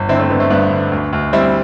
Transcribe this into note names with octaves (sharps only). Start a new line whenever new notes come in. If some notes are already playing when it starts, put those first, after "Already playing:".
Already playing: G1
D3 C4 E4
A3 C4
D3 B3
A3 C4
G2 B3 D4
D3
D2
D2
G3 C4 E4